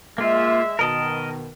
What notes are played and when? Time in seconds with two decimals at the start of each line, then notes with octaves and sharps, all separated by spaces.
0.18 G#3 A#3 F4 E5
0.79 B2 D#3 A#4 D#5 A5